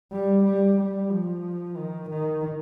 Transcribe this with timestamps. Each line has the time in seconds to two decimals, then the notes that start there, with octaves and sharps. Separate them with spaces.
0.12 G3
0.44 G3
0.77 G3
1.10 F3
1.77 D#3
2.10 D#3